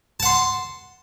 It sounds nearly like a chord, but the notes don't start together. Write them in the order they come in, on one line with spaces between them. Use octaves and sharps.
A5 F#5 C6